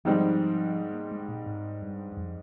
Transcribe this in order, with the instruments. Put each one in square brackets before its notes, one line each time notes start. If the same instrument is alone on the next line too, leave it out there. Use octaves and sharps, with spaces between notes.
[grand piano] G#2 D#3 G3 C4 [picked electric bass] F3
[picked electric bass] G#3
A#3
G#3
A#2
G#2
G2
G2
F2